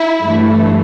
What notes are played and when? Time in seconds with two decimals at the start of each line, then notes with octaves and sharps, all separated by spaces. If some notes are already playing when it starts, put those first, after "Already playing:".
Already playing: E4
0.23 G2 E3 A3